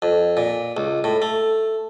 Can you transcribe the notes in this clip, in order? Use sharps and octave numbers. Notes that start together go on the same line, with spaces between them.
F2
A#2
C#2
A2
A3